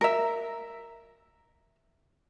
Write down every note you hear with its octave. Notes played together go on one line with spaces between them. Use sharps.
A#4 E5